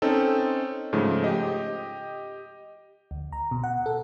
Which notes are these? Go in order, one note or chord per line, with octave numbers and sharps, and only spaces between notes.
C4 C#4 D#4 A4
G#2 C#3 F3 A3
G4 D#5
D2
A#5
B2
F#5
A4